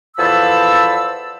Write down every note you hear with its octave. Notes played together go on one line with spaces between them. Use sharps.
E2 F3 A4 A5 B5 E6